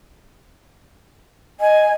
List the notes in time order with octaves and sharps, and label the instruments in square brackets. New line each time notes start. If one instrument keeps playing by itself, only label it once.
[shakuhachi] D#5 [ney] G#5